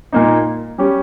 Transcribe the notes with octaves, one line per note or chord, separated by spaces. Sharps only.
A#2 A#3 D#4
G3 C#4 G4